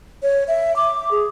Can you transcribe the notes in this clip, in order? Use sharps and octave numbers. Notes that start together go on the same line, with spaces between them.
C#5
E5
D6
G#4